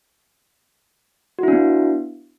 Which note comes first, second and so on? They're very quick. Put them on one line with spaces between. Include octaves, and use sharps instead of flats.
F#4 E4 D4 B3